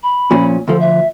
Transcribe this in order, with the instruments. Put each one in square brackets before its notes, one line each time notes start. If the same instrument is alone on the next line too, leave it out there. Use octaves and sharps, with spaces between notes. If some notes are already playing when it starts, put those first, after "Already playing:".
[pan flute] B5
[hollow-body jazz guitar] A#2 F3 C#4
[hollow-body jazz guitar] D2 F3 [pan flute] A4
[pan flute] E5